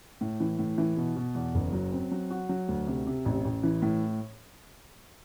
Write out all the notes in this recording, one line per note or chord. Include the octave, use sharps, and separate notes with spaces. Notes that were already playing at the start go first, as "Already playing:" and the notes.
A2
E3
A2
E3
B2
B2
E2
F#1
F#3
C4
F#3
F#4
F#3
D2
C3
C3
A1
A1
E3
A2